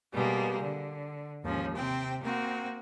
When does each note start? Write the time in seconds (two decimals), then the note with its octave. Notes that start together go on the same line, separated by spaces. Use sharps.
0.13 B2 G3 G#3 A#3
0.62 D3
1.43 D#2 G#2 F3 C#4
1.75 C3 C4 G5
2.22 A#3 C4 F#4